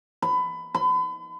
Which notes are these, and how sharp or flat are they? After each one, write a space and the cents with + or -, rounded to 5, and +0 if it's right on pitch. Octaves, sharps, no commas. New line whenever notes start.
B5 +25
B5 +40